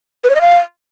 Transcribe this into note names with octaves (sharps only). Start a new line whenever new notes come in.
B4
C#5
D#5
F5